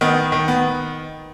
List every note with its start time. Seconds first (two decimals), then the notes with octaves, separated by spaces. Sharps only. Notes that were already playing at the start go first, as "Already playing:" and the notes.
0.01 D#3 B3
0.32 D#3
0.48 B3